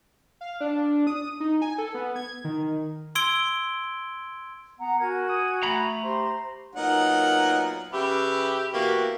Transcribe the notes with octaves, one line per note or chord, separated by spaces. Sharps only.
F5
D4
D#6
D#4
G#5
A4
B3
G#6
D#3
C6 E6 G#6 D7 G7
B3 F#5 A#5
F#4 A#4 G#5 G#6
D#6
A3 A#5 B5
G4 C5 C6
A#2 F#3 B3 D#4 A#4 F#5
C#3 G4 B4 E5
B2 E3 A#3 F#4 G4